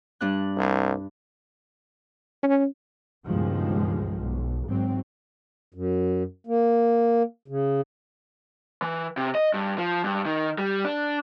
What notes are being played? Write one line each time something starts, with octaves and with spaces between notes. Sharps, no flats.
G2 D4 F#6
C2
C#4
C#2 G2 B2 D#3 F3 G#3
B1
G#1 F#3 C4
F#2
A#3
C#3
E3
C3
D#5
G2
F3
G2
D#3
G3
D4